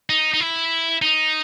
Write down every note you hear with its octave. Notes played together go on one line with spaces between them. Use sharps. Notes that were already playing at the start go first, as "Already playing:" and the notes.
D#4
D#4
E4
D#4